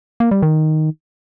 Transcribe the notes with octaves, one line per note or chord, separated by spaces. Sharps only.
A#3
G3
D#3